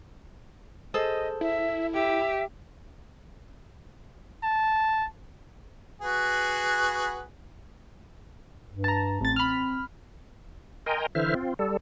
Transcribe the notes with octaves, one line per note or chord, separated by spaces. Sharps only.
G#4 A4 C5 D#5
E4 E5
G4 E5
A5
F#4 G#4 B4
G2
A5 A#5
A1 C4 A6
B5 F6
A#4 D#5 G5 G#5 A#5 C6
D3 E3 E4 C5 E5 F6
C4 F4
G3 A4